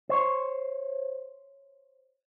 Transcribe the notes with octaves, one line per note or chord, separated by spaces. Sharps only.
C5 C#5